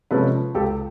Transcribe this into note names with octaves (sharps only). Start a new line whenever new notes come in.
C3 F3 G#3 C#4 A4 B4
C#2 G4 A4